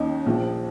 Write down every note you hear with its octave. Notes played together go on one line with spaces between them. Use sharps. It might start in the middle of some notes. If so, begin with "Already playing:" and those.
Already playing: D#2 D#3 C#4 D#4
A#1 A#2 F3